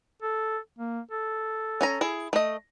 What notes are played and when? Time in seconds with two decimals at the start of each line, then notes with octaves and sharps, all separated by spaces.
0.23 A4
0.79 A#3
1.11 A4
1.81 C#4 G#5 A#5
2.01 E4 G#4
2.33 A3 D#5